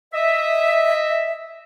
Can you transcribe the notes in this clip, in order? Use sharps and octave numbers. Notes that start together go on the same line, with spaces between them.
D#5 E5